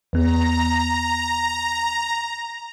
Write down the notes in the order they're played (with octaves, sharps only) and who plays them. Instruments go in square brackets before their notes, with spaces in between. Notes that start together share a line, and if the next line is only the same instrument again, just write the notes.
[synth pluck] E2 B3 [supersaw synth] A#5